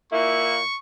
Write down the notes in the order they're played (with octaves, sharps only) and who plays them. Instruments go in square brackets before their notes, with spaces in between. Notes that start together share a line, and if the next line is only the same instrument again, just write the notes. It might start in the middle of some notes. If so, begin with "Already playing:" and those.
[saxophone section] A#2 A#3 E4 [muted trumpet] C#6